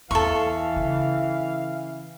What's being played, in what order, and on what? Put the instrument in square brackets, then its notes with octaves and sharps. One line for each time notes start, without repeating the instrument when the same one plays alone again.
[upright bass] E2 [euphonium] E3 [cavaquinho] A4 C#6 [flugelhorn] F5
[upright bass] C#3